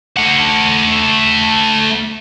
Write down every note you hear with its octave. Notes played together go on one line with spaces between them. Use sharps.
A3 F#5